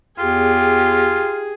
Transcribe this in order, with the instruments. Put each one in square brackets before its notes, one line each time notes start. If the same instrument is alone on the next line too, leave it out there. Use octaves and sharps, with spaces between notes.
[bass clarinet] E2 [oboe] F4 [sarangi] G4 [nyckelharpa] G#4